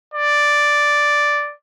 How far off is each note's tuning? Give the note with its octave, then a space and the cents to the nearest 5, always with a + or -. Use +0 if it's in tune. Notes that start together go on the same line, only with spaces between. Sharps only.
D5 +0